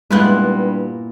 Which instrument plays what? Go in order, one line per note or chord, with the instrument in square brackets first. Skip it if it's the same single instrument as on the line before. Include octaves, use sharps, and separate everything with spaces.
[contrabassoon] G2 [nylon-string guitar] A#2 E4 [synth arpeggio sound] G#3 F#6 [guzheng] B3 F4 B4